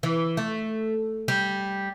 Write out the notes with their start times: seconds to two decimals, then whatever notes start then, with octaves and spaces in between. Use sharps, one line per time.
0.03 E3
0.37 A3
1.28 G3